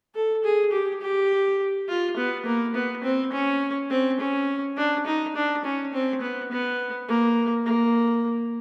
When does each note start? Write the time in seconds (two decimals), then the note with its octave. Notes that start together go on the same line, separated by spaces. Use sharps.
0.15 A4
0.44 G#4
0.72 G4
1.01 G4
1.89 F4
2.17 B3
2.46 A#3
2.75 B3
3.04 C4
3.33 C#4
3.90 C4
4.20 C#4
4.77 D4
5.06 D#4
5.35 D4
5.65 C#4
5.93 C4
6.22 B3
6.51 B3
7.09 A#3
7.66 A#3